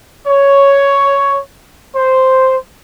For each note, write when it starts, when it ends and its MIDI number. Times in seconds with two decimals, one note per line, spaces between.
0.26 1.38 73
1.95 2.55 72